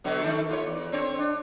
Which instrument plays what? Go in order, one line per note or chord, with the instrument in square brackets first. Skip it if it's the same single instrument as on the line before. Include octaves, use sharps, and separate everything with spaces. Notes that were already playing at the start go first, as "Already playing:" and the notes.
[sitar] B2 D3 F#3
D#3 A3 A4
D#2 F4 C#5
E2
C4 D4 C#5
D4